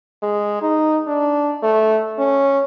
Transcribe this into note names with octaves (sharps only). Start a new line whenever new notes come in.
G#3
D#4
D4
A3
C#4